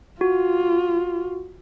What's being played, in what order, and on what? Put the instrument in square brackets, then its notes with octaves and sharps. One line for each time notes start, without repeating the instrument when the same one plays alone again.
[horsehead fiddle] F4 [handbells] F#4